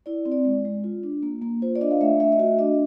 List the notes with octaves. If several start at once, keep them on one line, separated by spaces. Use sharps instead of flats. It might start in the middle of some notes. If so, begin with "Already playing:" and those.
E4 D5
C4
D5
G#3
G#3
F4
D4
A#3
A#3
F4 C5
D5
D4 D#5
F5
A3 E5
A3 E5
D#5
F#4 E5
D4 D#5